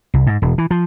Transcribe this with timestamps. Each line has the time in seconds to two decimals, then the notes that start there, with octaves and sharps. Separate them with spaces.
0.14 C2
0.27 G#2
0.42 E1
0.58 E3
0.71 F3